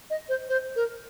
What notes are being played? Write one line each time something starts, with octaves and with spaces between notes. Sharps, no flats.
D#5
C5
C5
A#4